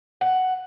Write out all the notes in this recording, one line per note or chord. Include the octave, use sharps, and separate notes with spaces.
F#5